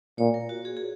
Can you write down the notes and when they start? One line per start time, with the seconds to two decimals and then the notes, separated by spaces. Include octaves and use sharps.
0.18 A#2 C#5
0.34 A#4
0.49 F#4
0.65 G#4
0.77 G#4